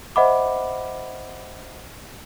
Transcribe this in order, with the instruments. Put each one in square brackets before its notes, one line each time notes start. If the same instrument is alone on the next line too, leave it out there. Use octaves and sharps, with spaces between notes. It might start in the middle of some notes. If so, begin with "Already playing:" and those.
[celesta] C5 D#5 E5 F#5 B5 D6